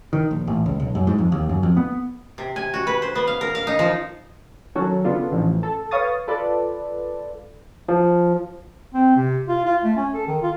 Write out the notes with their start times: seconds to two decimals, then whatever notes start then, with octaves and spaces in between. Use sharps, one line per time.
0.13 D#3
0.31 A#1
0.47 A1
0.66 C#2
0.80 B1
0.95 F#2
1.07 G#2
1.18 F2
1.32 D#2
1.49 F#2
1.63 F2
1.77 B3
2.38 C3
2.56 G#5
2.74 F#4
2.87 B4
3.02 C5
3.15 B3
3.27 F5
3.41 A#4
3.55 F5
3.67 D#4
3.79 F3
4.75 D#3 F#3 C#4 F#4 A4
5.04 C#3 B3 D4 F4 A4
5.31 A1 F3
5.63 A4
5.91 B4 C#5 F5 C#6 D#6 A6
6.27 F4 A4 B4 D5
7.88 F3
8.94 C4
9.16 C3
9.48 F4
9.66 F4
9.84 A3
9.96 C#4
10.14 A4
10.28 D#3
10.42 F4